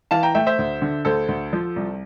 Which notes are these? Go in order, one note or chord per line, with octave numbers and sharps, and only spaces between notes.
E3 F5 A5
G5 A#5
A3 E5 G5
C5 E5
D2
D3
D2 A4 C5
D2
F3
C2